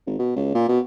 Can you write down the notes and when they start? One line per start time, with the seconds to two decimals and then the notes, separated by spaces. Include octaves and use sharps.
0.07 G#1
0.19 B2
0.36 C#2
0.55 A#2
0.69 B2